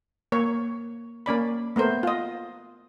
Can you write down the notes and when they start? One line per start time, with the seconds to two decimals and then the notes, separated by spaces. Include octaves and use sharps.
0.32 A#3 C#5
1.26 A#3 C#4 D5 B5
1.76 A3 B3 A#4 C5
2.03 F4 D#5